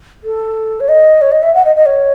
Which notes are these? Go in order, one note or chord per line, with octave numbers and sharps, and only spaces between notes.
A4
C#5
D#5
C#5
D#5
E5
F#5
D#5
D#5
C#5